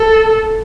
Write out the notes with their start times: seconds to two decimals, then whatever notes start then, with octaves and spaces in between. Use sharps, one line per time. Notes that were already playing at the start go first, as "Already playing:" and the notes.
Already playing: A4